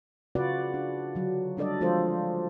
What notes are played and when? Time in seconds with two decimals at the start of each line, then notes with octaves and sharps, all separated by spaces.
0.35 C#3 F4 F#4 B4 D5 F#5
0.74 D4
1.15 D3 F#3
1.57 G3 D4 A4 D5 D#5
1.81 F3 G#3 D4 F4 A4 C5